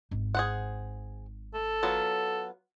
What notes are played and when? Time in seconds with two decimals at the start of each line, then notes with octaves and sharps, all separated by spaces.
0.11 G#1 D#4
0.35 G#4 C5 F#5
1.54 A4
1.83 F#3 B3 F4